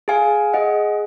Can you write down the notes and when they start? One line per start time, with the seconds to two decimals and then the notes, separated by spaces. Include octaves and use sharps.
0.08 G#4 F5 G#5
0.53 G#4 D#5 F#5